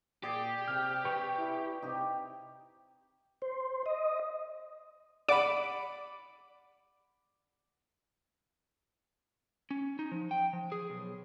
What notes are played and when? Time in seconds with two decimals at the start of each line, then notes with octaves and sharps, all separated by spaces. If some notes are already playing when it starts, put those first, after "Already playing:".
0.23 A#2 G4 G#4 D5
0.68 C3 F6
1.05 B4 G5 C#6
1.38 E4
1.82 C3 D#4 G4
3.42 C5
3.86 D#5
5.29 D5 F#5 B5 D6
9.71 C#4
9.99 D#4
10.12 F3
10.31 G5
10.53 F3
10.72 G#4
10.90 B1